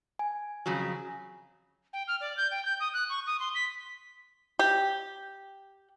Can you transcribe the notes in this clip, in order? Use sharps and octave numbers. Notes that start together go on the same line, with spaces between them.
G#5
F2 C#3 F#3
G5
F6
D5
G6
G5
G6
D#6
F#6
C#6
D#6
C6
B6
G4